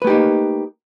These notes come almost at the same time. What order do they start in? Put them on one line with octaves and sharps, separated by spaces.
B4 A3 G4 D#4 A#3